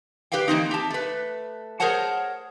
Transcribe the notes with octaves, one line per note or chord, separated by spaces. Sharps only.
G4 B4 D5 F5 G5
E3 A#3 C4 D#4
G4 A5
A3 B4
G#4 A#4 C5 C#5 F#5 A5